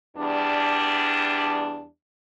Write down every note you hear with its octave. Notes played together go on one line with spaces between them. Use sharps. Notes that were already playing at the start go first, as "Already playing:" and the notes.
E2 G3 D4